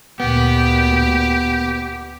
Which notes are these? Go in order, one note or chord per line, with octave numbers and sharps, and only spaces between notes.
D2 A#2 B3 G4